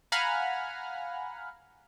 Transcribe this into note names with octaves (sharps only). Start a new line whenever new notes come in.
F5 F#5 G#5 A#5 B5 F6